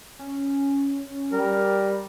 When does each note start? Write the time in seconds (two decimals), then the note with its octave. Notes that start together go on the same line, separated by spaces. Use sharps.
0.19 C#4
1.32 G3 A#4